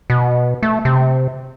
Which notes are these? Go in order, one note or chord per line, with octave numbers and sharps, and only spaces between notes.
B2
A3
C3